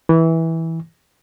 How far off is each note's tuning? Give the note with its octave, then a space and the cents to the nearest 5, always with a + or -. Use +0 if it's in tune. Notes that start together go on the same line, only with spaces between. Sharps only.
E3 -15